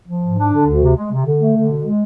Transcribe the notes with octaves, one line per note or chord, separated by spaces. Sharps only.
F3
G#2
D4
D3
D2
C3
G#3
C3
D3
A3
D3
B2
G#3